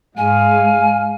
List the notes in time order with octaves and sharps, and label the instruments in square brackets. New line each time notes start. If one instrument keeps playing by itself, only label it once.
[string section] G#2 G#3 [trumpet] F5 [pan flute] G#5